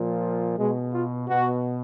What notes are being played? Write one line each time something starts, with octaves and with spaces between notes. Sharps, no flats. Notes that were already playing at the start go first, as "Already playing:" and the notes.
Already playing: A#2 F3
B2 G#3
F4
B2 F#4